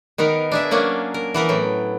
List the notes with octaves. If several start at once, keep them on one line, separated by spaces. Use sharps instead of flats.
D#3 B3 D#4 A#4
D4 G#4 E5
F#3 A#3 C#4 D4
A#4
E3 B3 A#4
A2 F#3 G5